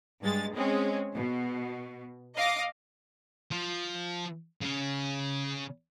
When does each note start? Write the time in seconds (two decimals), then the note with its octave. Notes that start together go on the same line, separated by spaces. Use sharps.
0.21 G2 G#3 A6
0.55 G#3 C4 C#4
1.15 B2
2.36 D#5 F5 D6 A#6
3.52 F3
4.61 C#3 C#4